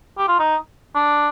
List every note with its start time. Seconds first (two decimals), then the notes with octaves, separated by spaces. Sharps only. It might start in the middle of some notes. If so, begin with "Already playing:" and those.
0.18 G4
0.28 F4
0.39 D#4
0.95 D4